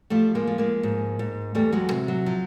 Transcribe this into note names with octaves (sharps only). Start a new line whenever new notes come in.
F3 G3 A3
G#3 A#3
F3
G#3 A#3
G#2
G#2
E2 G3 A3
F#3 G#3
C3
F#3
F3